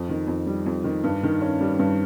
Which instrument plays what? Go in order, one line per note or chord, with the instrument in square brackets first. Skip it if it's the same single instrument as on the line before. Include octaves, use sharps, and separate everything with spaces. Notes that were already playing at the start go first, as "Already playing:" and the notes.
Already playing: [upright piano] F2
D#3
F2
G3
F2
D#3
G2
D#3
C#4
G3
G2